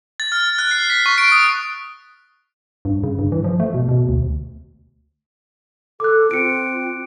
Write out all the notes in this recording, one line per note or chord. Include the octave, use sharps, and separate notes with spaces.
A6
F6
F#6
C7
B6
C#6
D7
D#6
G2
C#3
G2
E3
F3
A3
B2
B2
D2
A4 D6 F#6
C4 F4 C#7 D7